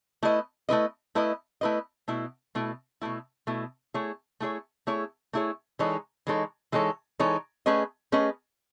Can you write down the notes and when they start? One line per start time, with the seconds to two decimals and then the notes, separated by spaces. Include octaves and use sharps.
0.23 A3 E4 B4 D#5
0.69 A3 E4 B4 D#5
1.15 A3 E4 B4 D#5
1.61 A3 E4 B4 D#5
2.08 B2 A3 E4
2.55 B2 A3 E4
3.02 B2 A3 E4
3.47 B2 A3 E4
3.94 A3 E4 G#4 C#5
4.40 A3 E4 G#4 C#5
4.87 A3 E4 G#4 C#5
5.33 A3 E4 G#4 C#5
5.79 E3 G#3 D#4 A4 C#5
6.27 E3 G#3 D#4 A4 C#5
6.72 E3 G#3 D#4 A4 C#5
7.19 E3 G#3 D#4 A4 C#5
7.66 A3 C#4 G#4 B4 D#5
8.12 A3 C#4 G#4 B4 D#5